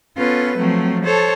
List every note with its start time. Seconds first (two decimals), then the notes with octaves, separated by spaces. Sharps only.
0.17 B3 C#4 F4 A4 B4
0.57 F3 F#3 A3 C4
1.04 A4 C5 C#5 A5